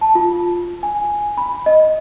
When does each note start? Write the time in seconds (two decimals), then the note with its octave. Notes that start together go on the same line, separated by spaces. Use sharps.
0.01 A5
0.15 F4
0.83 G#5
1.38 B5
1.66 D#5